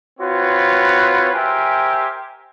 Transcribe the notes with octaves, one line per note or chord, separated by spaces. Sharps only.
C4 F4 F#4 B4 C#5
G4 A#4 C5 E5 G#5